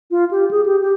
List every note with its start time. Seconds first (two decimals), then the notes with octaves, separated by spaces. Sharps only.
0.11 F4
0.31 G4
0.51 G#4
0.66 G4
0.81 G4